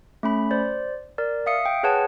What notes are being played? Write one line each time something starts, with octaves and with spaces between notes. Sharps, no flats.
A3 C#4 B5
C5 D5
A#4 D5
E5 F5 D#6 C#7
G5
G#4 B4 C#5 F#5 A5